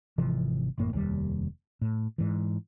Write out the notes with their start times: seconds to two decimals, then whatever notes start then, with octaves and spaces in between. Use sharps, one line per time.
0.18 G#1 C3 E3 F3
0.78 A1 F#2 A2 A#3
0.93 F1 D#2 B2 G3
1.82 A2
2.18 G#2 E3